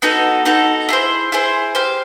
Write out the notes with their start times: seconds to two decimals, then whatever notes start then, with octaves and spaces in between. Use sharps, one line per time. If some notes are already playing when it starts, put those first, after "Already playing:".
0.02 B3 D#4 F#4 A4
0.45 B3 D#4 F#4 A4
0.89 E4 G#4 C5
1.32 E4 G#4 C5
1.75 G4 C5 F5